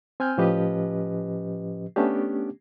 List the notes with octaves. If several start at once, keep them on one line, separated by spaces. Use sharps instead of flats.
C4 G#5 F6 G6
A2 F3 C#4 G4 B4 D#5
A3 B3 C#4 D4 G4